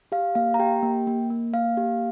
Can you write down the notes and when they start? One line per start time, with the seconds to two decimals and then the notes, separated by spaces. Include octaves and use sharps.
0.12 G4 F5
0.35 A#3 F5
0.54 A#5
0.59 G4 G5
0.82 A#3
1.07 A#3
1.30 A#3
1.54 A#3 F5
1.77 G4